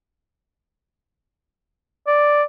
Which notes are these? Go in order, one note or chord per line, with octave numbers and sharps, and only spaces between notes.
D5